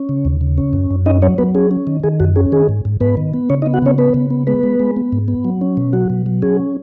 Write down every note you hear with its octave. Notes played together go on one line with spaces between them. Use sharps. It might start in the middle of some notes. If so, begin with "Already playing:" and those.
Already playing: C#4
C#3
D#2
C#3
C#4
F#2
F#2
C#4 D#4 D#5
F#3 C#4 C#5
F#3 B3 B4
C#4 G#4
C#4
D#3
D#3 G#4
F#2 F#4
C#4 G#4
D#3 G#4
G#2
G#2
G#2 B3 B4
D#3
B3
C#3 C#4 C#5
D#4 D#5
B3
F#4 F#5
C#3 C#4 C#5
B3 B4
C#3
B3
G#3 B3 B4
G#3
G#3
B3
G#2
B3
F#3
C#4
B2
F#3 F#4
B2
F#3
C#4 G#4